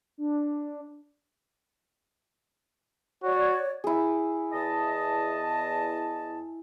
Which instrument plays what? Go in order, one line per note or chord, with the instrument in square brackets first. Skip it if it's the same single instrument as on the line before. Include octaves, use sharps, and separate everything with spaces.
[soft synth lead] D4
[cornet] F#4 [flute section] C#5 D5
[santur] E4 G#4
[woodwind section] E2 D#5 A5